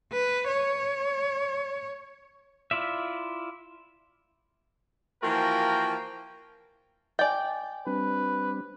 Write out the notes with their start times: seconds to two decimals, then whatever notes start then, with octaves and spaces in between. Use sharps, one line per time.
0.12 B4
0.48 C#5
2.71 E4 F4 D5 E5
5.23 E3 F3 A#3 F#4 A#4 G5
7.19 D5 D#5 G5 G#5
7.87 G3 C4 D4 B4